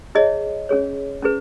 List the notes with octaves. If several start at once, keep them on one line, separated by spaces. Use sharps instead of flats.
E4 G#4 C#5 D#5
C#4 G#4 C#5
C#4 E4 G#4 B4